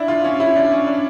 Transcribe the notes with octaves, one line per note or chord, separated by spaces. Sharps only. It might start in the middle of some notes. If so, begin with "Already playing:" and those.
Already playing: D4 E4
F4
C#4
E4
D4
C#4
D4